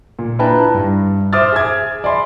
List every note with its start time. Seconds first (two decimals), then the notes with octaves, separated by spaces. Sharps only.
0.19 A#2
0.39 D4 E4 B4 G5 A5 A#5
0.74 G2
1.33 C5 E5 D6 D#6 F6 A6
1.52 G#4 E5 G#5 G#6
2.04 D5 E5 G#5 B5 C6